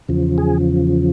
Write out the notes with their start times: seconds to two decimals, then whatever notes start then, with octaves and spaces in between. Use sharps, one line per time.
0.09 E2 C#3 F3
0.38 G#4